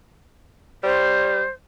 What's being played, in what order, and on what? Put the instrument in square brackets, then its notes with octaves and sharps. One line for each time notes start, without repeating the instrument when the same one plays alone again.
[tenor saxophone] G3 [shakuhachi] C5